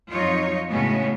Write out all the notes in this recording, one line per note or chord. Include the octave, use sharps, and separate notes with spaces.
F2 F#3 D#4 F4 C#5
A2 C#3 G#3 B3 C#4 F#4